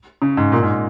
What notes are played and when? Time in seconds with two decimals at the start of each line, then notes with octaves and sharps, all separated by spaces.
0.22 C#3
0.37 G#2
0.52 A#2
0.63 G#2